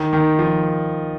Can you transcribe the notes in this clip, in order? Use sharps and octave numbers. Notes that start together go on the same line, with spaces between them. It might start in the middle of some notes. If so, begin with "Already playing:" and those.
Already playing: D#3
D#3
F3